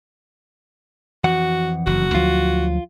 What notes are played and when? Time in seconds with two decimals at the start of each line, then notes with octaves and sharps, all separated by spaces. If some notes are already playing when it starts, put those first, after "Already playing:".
1.24 F2 E3 F#4 F#5
1.87 F#1 F#4
2.15 D2 F3 F#3 F4